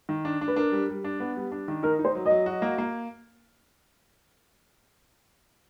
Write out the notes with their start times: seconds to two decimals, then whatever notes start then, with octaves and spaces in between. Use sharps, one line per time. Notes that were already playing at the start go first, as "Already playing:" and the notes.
0.09 D#3
0.25 D4
0.41 D4
0.48 B4
0.56 D4 A#4
0.72 G3
0.89 G3
1.04 D4
1.20 B3
1.36 G3
1.52 D4
1.68 D#3
1.83 D#4 A#4
1.99 D#4
2.05 C5
2.15 F#3
2.26 F#3 D#5
2.46 F#4
2.62 A#3
2.78 A#3